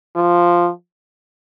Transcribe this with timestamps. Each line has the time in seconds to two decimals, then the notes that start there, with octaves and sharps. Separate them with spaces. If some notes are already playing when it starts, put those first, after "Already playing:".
0.16 F3